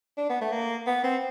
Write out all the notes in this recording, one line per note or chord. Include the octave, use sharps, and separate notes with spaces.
D4
B3
A3
A#3
B3
C4